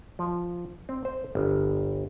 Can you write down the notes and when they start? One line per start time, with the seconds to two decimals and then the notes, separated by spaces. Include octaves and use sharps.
0.19 F3
0.89 C4
1.05 C5
1.35 G1